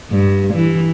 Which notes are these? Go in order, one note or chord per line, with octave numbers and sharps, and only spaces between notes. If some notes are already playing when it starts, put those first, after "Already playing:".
G2
E3